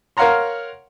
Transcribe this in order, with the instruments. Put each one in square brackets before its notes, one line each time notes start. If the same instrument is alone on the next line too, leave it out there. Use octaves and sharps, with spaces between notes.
[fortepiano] A#4 C#5 F5 F#5 A#5 C6